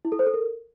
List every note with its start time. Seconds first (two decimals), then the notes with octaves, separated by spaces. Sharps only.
0.05 E4
0.12 A4
0.19 C5
0.26 A4
0.34 A#4